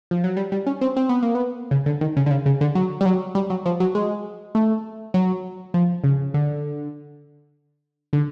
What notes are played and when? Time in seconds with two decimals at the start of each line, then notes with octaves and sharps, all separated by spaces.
0.11 F3
0.24 F#3
0.37 G3
0.52 G3
0.67 C#4
0.81 C4
0.96 C4
1.09 B3
1.22 A#3
1.35 B3
1.71 C#3
1.86 D3
2.01 D#3
2.17 C#3
2.26 D3
2.31 C#3
2.46 C#3
2.61 D3
2.75 F#3
3.01 G3
3.06 F#3
3.35 G3
3.50 F#3
3.66 F3
3.80 F#3
3.95 G#3
4.55 A3
5.14 F#3
5.74 F3
6.04 C#3
6.34 D3
8.13 D3